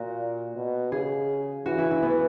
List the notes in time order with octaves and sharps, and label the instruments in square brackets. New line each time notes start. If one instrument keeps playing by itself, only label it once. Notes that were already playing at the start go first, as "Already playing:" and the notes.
Already playing: [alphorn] A#2 [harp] F#4
[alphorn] B2
[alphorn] C#3 [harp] G#4
[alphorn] E3 [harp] F#4
[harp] E4
E4
B3